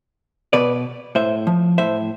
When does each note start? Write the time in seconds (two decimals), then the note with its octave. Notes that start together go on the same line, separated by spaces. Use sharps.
0.53 B2 B4 D5
1.15 A2 C5 E5
1.47 F3
1.78 A2 C5 E5